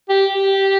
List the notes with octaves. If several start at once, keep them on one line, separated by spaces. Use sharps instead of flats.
G4
G4